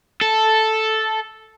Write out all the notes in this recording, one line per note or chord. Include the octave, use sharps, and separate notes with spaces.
A4